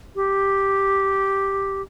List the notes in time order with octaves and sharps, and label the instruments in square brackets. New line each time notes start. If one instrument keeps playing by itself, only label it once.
[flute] G4